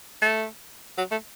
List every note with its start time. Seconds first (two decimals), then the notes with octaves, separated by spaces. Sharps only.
0.22 A3
0.98 F#3
1.11 A3